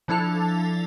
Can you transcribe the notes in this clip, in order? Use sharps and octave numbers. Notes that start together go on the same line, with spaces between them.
F3 D4 E4 A4 A5 F7